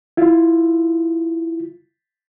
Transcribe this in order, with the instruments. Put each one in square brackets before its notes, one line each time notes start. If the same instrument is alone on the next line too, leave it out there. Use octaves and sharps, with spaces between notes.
[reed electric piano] E4 F4